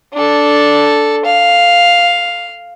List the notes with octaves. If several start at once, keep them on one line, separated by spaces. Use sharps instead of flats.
D4 A4
F5